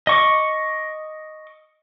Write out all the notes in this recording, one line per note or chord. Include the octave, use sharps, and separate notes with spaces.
D#5 C#6 D6